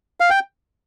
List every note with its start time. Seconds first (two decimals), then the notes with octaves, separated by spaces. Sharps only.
0.20 F5
0.30 G5